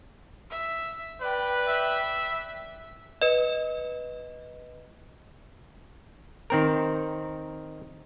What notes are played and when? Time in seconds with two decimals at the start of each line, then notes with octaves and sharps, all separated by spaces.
0.50 E5
1.21 B4 D5 G5
1.68 E5
3.22 B4 D#5
6.50 D#3 C4 A#4